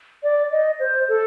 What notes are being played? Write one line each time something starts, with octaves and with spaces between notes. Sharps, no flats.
D5
D#5
C5
A4